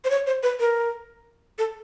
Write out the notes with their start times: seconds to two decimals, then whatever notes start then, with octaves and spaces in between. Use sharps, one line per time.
0.04 C5
0.10 C#5
0.27 C5
0.43 B4
0.60 A#4
1.58 A4